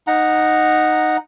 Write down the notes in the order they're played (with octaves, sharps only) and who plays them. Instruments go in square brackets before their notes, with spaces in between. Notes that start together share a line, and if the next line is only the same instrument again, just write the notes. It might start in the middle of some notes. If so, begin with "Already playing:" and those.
[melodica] D#4 F#5 A#5